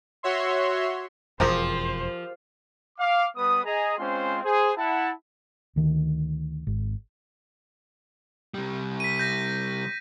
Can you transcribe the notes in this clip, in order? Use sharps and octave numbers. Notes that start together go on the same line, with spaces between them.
F#4 C#5 E5 C6
E1 F2 F3 G4 G#4 A#4 C5
F5 D6
G3 B3 B4 D#6
G#4 D#5 A#5
G#3 C4 C#4 F4 C5 C6
G#4 C5
E4 F#5 A5
D2 D#3
G#1
C3 G3
B6 D#7
G6 A#6